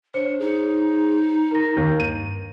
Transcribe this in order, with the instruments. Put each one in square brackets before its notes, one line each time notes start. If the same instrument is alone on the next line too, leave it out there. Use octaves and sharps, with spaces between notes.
[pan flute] D4 [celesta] C5 C#5 [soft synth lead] C#7
[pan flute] D#4 [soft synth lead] G#4
[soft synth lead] A#4 [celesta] A#5 A#6
[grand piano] D#2 [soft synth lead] G6
[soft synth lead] G2 [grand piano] D#7